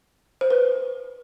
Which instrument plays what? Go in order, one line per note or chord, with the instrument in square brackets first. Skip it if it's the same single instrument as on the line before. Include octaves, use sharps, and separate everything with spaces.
[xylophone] C5
B4